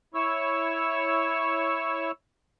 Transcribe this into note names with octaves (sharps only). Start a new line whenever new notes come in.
E4 C#5 C#6 E6